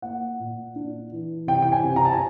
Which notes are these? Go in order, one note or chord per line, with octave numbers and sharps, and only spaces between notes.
A#3 F#5
A#2
D4
E3
C3 G5
G5
G#5
C3
A#5
A5
G#5